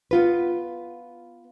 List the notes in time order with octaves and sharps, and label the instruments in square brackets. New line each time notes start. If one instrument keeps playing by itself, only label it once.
[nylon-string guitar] B3 F4 B4